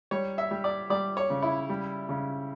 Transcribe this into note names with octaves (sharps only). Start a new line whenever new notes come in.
G3 C#5
E5
G3
D5
G3 D5
C#5
C#3
E4
G3
C#3